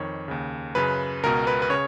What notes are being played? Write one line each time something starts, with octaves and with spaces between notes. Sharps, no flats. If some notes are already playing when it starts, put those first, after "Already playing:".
Already playing: F2 D#3 C#5
D#2 C#3
F#2 C#3 B4
C#2 B2 A#4
B4
B4
C#3 C#5